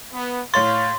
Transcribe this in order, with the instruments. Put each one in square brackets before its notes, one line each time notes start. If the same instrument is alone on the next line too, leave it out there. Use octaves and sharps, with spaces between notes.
[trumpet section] B3
[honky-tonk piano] A2 C#5 A6 [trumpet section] F5 [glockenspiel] C6